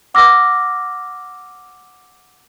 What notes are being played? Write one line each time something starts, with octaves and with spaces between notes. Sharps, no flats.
F#5 D6 E6 F6 A#6